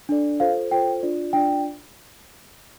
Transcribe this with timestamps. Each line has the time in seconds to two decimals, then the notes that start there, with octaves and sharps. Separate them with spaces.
0.09 D4 A4 D5
0.40 F4 A4 C5 F5
0.71 F4 A4 C5 G5
1.03 D4 F4 D5
1.33 D4 F4 D5 G5